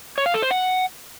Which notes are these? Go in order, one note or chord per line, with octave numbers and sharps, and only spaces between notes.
C#5
F5
A4
C5
F#5